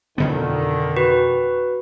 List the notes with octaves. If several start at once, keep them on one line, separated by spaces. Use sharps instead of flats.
F2 B2 D3 D#3 B3
F#4 B4